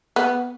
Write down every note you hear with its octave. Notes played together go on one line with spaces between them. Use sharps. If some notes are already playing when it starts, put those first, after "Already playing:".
B3